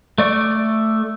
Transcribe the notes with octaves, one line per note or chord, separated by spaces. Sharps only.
A3 D5 C#6